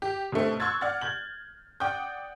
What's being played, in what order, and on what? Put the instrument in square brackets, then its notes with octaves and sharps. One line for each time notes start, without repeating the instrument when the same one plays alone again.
[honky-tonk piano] G4
B2 D3 A3 C4
C6 C#6 E6 F#6 G#6 A6
D5 F#5 F6 A6
G6 G#6 F#7
D5 F#5 G5 D6 D#6 G6